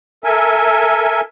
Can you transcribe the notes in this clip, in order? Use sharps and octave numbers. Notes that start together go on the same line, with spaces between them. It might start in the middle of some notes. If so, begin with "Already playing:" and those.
A4 A#4 E5 G#5